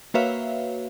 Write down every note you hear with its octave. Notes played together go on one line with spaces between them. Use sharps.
A#3 F#4 B4 C#5 E5 F5